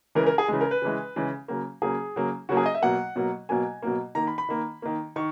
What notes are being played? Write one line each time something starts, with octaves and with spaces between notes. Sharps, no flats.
C#3 E3 G#3 A#4
A#4
G#4
C#3 E3 G#3
A#4
B4
C#3 E3 G#3
C#3 E3 G#3
C#3 F#3 A#3
C#3 F#3 A#3 G#4
C#3 F#3 A#3
C#3 F#3 A#3 F#4
G#4
D#5
E5
B2 F#3 A#3 F#5
B2 F#3 A#3
B2 F#3 A#3 G#5
B2 F#3 A#3
D#3 A#3 A#5
B5
B5
D#3 A#3
D#3 A#3
D#3 C#6